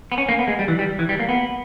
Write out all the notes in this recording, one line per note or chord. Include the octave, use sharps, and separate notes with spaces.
B3
C#4
A#3
B3
G#3
G3
E3
G3
E3
G3
A#3
B3